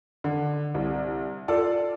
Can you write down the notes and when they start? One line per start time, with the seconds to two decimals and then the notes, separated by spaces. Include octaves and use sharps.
0.24 D3
0.74 C2
1.48 F4 A4 D5